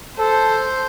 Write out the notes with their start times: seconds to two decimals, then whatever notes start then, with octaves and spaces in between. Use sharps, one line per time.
0.18 A4 C5